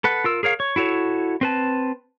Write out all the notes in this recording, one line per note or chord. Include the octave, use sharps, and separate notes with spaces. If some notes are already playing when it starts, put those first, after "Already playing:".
A4 B4 F#5
F4 A#4 E6
G#4 A#4 C#5 F5
C#5
E4 F#4 A4 C#5
C4 B4 A5